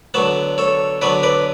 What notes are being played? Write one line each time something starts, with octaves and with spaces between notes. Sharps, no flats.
D3 F#3 B3 F#5 A5
A4 C#5
D3 F#3 B3 B4 D5
B4 D5